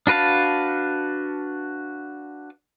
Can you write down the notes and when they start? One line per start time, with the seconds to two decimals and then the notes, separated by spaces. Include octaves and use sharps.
0.07 D4 F#4 B4 F5 A5